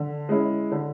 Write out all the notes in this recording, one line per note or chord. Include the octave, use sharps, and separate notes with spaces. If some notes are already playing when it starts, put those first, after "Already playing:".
Already playing: D3
G#3 C#4 E4
D3